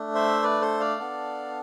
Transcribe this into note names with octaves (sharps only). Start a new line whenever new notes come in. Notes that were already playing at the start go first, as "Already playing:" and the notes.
Already playing: A3 D4
C5 E5
B4 D5
A4 C5
D5 F5
B3 D4 A4